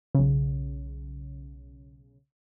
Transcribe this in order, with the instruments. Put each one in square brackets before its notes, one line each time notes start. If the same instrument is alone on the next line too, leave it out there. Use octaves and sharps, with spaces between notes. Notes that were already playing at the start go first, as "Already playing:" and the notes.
[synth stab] B1 C#3